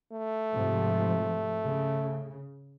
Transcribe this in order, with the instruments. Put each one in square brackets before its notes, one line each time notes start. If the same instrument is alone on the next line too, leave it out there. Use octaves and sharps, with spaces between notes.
[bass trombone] A3
[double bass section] G#2 C3 F3
C#3